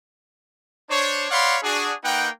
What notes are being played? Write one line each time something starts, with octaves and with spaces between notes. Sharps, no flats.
D4 C5 C#5
C#5 D5 F5 F#5 B5 C6
D4 F#4 G#4
A#3 D#4 B4 F#5 G5